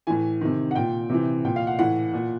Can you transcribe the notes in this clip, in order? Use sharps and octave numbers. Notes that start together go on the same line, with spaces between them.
A2 E3 G#5
C3 D#3
F#5
A#2 G5
C3 E3
A#2 G5
F5
F#5
A2 E3 F#5
A#2